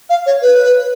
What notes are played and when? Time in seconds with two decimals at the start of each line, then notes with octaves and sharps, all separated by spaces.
0.09 F5
0.26 C#5
0.42 B4